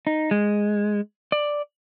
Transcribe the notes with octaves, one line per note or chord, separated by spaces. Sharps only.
D#4
G#3
D5